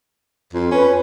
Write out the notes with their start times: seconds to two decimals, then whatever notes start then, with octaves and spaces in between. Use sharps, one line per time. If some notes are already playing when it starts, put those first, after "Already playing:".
0.53 F2
0.72 C#4 B4